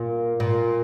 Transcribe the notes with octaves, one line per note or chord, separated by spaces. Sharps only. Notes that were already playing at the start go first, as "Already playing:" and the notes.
Already playing: A#2
A#2